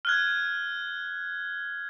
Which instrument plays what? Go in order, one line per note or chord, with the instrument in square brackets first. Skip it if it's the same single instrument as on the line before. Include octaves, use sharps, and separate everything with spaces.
[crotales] F6 F#6 G#6